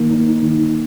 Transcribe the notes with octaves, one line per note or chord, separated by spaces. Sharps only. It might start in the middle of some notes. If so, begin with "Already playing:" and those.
Already playing: D#3 A#3
D#4
D#3